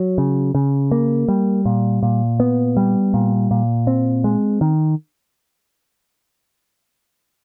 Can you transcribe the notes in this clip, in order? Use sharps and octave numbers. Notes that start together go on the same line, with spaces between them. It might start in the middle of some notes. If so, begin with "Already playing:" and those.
Already playing: F#3
C#3
C#3
A#3
G3
A#2
A#2
B3
G3
A#2
A#2
C4
G#3
D#3